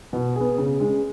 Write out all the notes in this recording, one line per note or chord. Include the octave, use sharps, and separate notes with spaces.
B2
B3 G#4
C#3
G#3 C#4 G#4